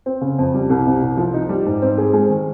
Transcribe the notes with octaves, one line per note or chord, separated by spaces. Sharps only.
C4
C#3
F2
G3
C2
C3
C2
F3
D#4
G3
G#2
C4
G#4
G#3
D#3